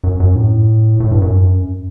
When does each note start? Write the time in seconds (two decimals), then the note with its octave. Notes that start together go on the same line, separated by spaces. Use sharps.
0.04 F#2
0.20 F#2
0.35 A2
1.00 A2
1.11 G2
1.22 F#2